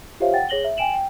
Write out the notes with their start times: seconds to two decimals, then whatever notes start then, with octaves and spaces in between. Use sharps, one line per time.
0.20 F4 G4 C5 C#5 E5 F5
0.33 F#5 G5 A6
0.49 G#4 C#5 A#6 F#7 G7
0.64 E5
0.77 G5 G#5 D7 E7 F#7
0.94 G5